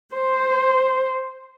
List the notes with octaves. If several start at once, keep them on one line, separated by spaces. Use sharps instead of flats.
C5